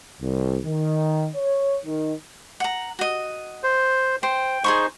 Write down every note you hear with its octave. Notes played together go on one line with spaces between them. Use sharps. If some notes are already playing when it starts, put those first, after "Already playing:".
C2
D#3
C#5
D#3
F#5 A#5
F#4 D#5
C5
C5 G5
D#4 G#4 C5 C6 C#6